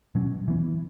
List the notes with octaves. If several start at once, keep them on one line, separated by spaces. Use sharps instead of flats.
B2 F#3 C#4
E3 B3